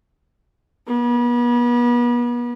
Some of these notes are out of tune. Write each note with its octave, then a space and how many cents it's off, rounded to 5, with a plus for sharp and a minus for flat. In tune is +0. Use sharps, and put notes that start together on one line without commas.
B3 -40